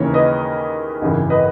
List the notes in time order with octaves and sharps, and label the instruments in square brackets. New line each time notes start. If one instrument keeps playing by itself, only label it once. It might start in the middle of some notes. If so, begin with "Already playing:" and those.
Already playing: [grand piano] D#2 C#3 E3 A#4 C#5
B4 D#5
G#1 F#2 C#3 E3
B4 D#5